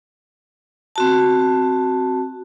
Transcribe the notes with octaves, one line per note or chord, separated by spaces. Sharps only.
C4 F#4 A5